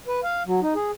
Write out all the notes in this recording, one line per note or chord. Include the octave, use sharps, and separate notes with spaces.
B4
F5
F#3
D#4
G#4